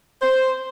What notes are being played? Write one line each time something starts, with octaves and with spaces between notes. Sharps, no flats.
C5